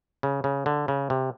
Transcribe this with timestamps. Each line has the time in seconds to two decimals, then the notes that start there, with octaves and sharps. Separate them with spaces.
0.23 C#3
0.44 C#3
0.66 D3
0.88 C#3
1.10 C3